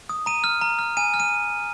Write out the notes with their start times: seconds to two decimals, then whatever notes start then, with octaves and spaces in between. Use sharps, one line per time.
0.09 D#6
0.26 A#5 D#7
0.44 F6
0.61 A#5
0.79 F6
0.97 G#5 D#7
1.14 F6
1.20 D#7